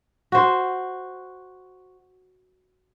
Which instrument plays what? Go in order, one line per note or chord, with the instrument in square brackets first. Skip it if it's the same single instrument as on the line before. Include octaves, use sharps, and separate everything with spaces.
[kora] F#4 C5